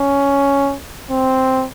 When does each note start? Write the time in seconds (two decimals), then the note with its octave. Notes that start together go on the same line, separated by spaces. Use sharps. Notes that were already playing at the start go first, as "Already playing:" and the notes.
Already playing: C#4
1.11 C4